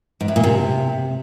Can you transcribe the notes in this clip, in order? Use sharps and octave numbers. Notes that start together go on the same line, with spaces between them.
G#2
A2
A#2
C3